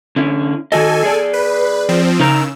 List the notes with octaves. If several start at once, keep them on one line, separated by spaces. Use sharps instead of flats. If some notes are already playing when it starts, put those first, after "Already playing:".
D3 C#4 E4
D#3 F#4 A4 D#5 G#5
G#4 D5
B4
F3 C4
C#3 D#4 A#4 A#5 E6